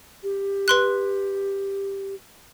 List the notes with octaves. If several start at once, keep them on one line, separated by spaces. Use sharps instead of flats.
G4
B4 C6 F#6